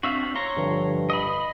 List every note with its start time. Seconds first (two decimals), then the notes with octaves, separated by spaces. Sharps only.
0.03 C4 D4 F#4 E5 F5
0.36 C#5 A#5 C6 C#6
0.57 G2 D3 F3
1.10 D#5 B5 C6